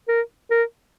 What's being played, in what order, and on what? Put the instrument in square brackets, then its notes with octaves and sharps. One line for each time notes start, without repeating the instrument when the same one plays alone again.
[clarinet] A#4
A#4